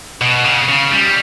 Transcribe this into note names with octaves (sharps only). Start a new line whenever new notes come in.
B2
C#3
C#3
G3